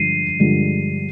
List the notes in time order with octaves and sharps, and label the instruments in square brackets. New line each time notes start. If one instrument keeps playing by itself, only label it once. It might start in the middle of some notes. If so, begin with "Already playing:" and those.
Already playing: [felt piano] G2 D3 F3 G#3 D4 [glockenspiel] C7 D#7
[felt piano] G2 D3 F3 G#3 D4